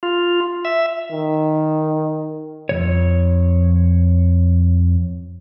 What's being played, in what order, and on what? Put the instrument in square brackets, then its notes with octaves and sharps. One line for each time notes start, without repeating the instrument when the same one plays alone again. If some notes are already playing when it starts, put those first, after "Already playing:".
[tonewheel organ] F4
E5
[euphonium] D#3
[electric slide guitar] F2 D#3 C#5